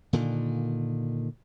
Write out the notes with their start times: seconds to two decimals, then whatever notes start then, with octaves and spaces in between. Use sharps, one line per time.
0.13 A#2 D3 D#3